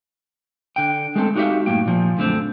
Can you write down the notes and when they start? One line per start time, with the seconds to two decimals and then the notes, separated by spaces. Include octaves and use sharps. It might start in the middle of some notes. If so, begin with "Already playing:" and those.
0.76 D3 G5
1.15 G#3 A3 B3 C4 F4 A4
1.36 D#4 F#4 G4 C#5 E5 F5
1.66 F#2 A2 A#3 G5
1.86 A#2 F3
2.18 F#2 D3 A3 C4